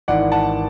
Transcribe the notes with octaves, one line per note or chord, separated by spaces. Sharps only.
G#1 G#2 E3 D5 F#5
F#5 A5